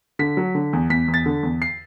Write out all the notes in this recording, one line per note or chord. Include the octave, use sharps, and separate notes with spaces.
D3 B6
F#3
D3
E2
E2 B6
E2
A6
D3
E2
C7